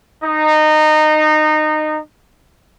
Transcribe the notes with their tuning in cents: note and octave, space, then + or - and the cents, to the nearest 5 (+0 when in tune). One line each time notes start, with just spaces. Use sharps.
D#4 -20